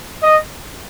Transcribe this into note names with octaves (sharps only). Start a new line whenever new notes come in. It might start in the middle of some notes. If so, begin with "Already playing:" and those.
D#5